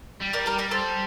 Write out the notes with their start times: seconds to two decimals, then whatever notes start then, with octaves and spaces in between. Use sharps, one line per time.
0.21 G3
0.33 A#4 D5
0.46 G4 A#4
0.58 A#4 D5
0.71 A4 C5